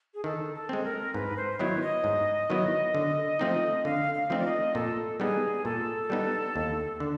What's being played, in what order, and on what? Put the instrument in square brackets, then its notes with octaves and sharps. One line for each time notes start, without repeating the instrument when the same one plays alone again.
[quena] G#4
[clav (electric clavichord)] D#3 [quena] A4
[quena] A4
[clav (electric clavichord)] G#3 C4
[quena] A#4
[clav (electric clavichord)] G#2 [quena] B4
[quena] C5
[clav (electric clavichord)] D#3 F#3 B3 E4 [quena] C#5
[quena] D#5
[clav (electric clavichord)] G#2
D#3 F#3 B3 E4
D3
F3 A3 C4 D#4
[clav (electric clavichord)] D3 [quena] F5
[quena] F5
[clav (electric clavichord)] F3 A3 C4 D#4
[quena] D5
D#5
[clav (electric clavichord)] A#2 [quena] A4
[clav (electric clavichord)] G3 B3 D#4 [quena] G#4
[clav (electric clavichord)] A#2 [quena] A4
[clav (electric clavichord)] G3 B3 D#4
D#2
D3